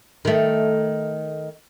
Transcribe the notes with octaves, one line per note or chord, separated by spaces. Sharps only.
D#3 A3